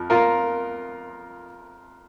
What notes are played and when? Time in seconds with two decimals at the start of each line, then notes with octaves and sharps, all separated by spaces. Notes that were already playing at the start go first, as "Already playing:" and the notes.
Already playing: F2 F3
0.10 F4 A#4